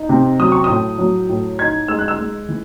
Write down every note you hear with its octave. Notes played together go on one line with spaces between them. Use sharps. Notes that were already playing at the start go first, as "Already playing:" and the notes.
Already playing: D#4
C3
F#3 D#6
C#6
A2 D#6
F#3
A2
D#4 G#6
G#3 E6
F#6
E6
G#3
E3